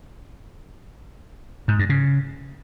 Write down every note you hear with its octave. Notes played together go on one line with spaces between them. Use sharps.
G#2
G2
C#3